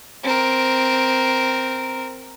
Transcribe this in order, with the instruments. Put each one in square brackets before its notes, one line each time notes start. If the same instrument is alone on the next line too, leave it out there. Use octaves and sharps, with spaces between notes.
[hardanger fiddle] C4 A#4